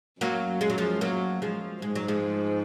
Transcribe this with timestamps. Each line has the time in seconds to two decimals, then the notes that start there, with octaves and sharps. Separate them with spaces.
0.21 F#2 F#3 A#3
0.61 G#3
0.70 F#3
0.78 F3 G#3
1.01 F#3 A#3
1.42 F3 G#3
1.82 G#2 G#3
1.95 F#3
2.08 F3 G#3